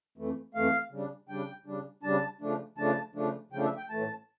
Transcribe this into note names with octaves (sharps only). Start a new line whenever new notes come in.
F2 E3 A3
F2 E3 A3 F5
C#3 G3 D4
C#3 G3 D4 G5
C#3 G3 D4
C#3 G3 D4 A5
C#3 F3 A3 D4
C#3 F3 A3 D4 A5
C#3 F3 A3 D4
C#3 F3 A3 D4 G5
E5
G5
A2 E3 A3 A5